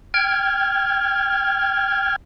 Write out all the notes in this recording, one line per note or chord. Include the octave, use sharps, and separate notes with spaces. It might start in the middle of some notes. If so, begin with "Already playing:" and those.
G5 F6 G#6